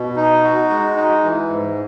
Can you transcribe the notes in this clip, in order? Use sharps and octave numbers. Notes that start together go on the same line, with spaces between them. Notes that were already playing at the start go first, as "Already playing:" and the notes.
Already playing: B2
D#4
F#4
G#3
D#4
E3
G#2